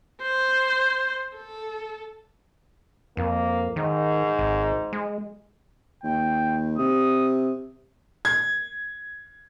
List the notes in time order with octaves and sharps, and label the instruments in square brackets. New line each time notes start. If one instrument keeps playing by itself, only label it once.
[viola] C5
A4
[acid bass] F2 [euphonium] A#3
[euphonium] G#2 [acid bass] D#3
[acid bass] G#1
G#3
[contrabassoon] D#2 [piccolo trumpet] G5
[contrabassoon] C3 [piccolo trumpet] D#6
[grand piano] G#6